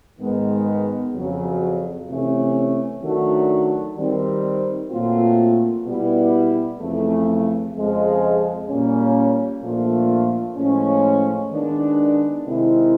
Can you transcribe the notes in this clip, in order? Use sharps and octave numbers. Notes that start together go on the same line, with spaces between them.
G#2 D#3 G#3 B3
F2 C#3 F#3
C3 E3 A3 C#4
D#3 F#3 A3 D4 F#4
D#3 G3 C4
A#2 F#3 A3 C4 F4
B2 G3 B3 E4
F2 C#3 E3 A3
F2 C#3 F3 G#3
A#2 G3 A#3 C#4
A#2 F3 A3 D4 F4
A2 F3 G#3 C#4
D#3 G#3 B3 D4
C3 D#3 G#3 C4 E4